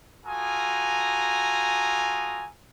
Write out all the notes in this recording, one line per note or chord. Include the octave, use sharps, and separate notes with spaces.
F4 F#4 A4 G#5 A#5 D#6